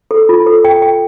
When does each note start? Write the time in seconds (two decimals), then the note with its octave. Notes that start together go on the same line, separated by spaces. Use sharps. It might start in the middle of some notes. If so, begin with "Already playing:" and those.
0.11 A4
0.29 F4
0.46 A4
0.64 G5
0.82 G5